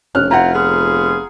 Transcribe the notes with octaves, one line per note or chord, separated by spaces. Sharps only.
F1 C#4 F6 F#6
C4 E4 F4 F#5 A#5
B3 F4 G#4